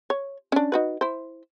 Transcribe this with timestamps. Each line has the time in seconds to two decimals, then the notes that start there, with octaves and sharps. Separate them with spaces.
0.10 C#5
0.52 C#4 D4
0.72 D#4 F#4 B4
1.01 E4 C5